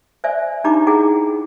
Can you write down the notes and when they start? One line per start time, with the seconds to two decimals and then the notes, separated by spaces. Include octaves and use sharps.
0.24 C5 D5 E5 G#5
0.64 D4 D#4 G4 A#5 B5 D6
0.87 E4 G#4 F#5 G5 A#5